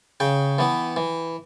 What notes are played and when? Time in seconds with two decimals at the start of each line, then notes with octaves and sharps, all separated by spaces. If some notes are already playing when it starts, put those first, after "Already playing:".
0.20 C#3 G5
0.59 E3 B3
0.96 E3